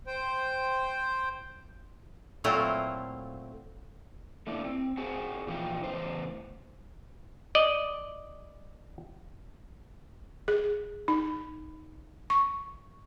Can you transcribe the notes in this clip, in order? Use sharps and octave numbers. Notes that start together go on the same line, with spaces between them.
C5 G5
A#2 F#3 A3 C4 E4 F4
A3 A#3 D4 E4
C4
C4 F#4 G#4 C5 F#5 G#5
A#2 E3 F3 D#4 F4 G5
A2 C#3 E3 B3 C5
D5 D#5
G#4
D#4
C#6